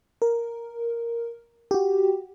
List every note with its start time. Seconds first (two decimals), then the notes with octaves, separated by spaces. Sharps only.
0.22 A#4
1.71 F#4 G4